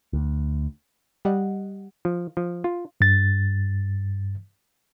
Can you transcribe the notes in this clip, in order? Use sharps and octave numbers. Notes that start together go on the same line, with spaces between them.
D2
G3 G4 D#5 F#5
F3
F3
F4
G2 A6